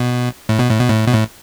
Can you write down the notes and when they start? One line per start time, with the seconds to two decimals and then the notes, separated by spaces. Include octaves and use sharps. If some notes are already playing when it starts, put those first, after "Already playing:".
Already playing: B2
0.49 A2
0.59 B2
0.70 A2
0.80 B2
0.89 A2
1.07 B2
1.13 A2